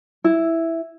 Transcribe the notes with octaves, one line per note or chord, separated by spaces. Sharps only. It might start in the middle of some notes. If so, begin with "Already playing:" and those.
E4